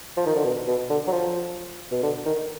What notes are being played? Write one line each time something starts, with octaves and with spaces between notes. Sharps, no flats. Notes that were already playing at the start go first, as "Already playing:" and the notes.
F3
D#3
D3
B2
B2
D3
F#3
F3
B2
D3
D#3